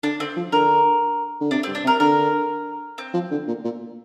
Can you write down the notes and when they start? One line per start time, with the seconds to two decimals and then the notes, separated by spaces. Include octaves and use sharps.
0.03 D3 D4
0.20 D3 C4
0.36 F3
0.52 D3 A#4
1.41 D3
1.51 C3 D4
1.63 C4
1.68 G2
1.75 D4
1.84 C3
1.87 A#4
2.00 D3 A#4
2.98 C4
3.14 F3
3.31 D3
3.47 A#2
3.64 A#2